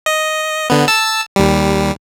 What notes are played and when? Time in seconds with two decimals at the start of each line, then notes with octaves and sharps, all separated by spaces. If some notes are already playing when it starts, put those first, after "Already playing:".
0.06 D#5
0.70 D3 B3
0.88 A5 E6
1.36 D#2 G3